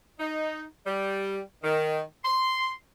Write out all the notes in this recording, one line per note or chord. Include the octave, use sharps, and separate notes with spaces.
D#4
G3
D#3
C6